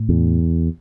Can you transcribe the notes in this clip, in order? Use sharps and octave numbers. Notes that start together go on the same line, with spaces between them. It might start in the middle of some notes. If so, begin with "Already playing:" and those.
Already playing: A2
E2